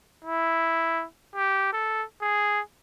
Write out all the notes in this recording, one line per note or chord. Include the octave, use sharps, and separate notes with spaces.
E4
G4
A4
G#4